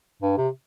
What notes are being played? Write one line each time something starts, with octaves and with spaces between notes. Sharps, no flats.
G2
C3